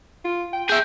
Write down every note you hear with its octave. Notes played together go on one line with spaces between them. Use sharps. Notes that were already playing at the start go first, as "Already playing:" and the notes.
F4
G5
G#4 E5 G6